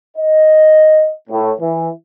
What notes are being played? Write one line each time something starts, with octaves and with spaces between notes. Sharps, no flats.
D#5
A2
E3